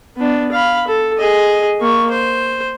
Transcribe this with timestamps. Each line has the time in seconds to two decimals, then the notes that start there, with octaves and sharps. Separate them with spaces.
0.17 B3 D4
0.51 F5 B5
0.87 A4
1.18 G#4 D#5
1.80 A#3 C#6
2.11 C5